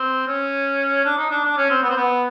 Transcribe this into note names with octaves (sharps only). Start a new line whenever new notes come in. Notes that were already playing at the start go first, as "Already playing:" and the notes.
Already playing: C4
C#4
D4
D#4
D4
D4
C#4
C4
B3
C4
B3